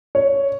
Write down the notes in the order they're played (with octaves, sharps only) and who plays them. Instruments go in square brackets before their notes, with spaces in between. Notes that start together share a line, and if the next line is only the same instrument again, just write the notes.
[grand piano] C#5